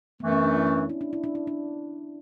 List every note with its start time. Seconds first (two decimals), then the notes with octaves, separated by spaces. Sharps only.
0.20 F#2 E3 A3 B3
0.33 C#4
0.44 D4
0.55 E4
0.67 C#4
0.78 D4
0.89 E4
1.01 D4
1.13 E4
1.24 D4
1.35 E4
1.47 D4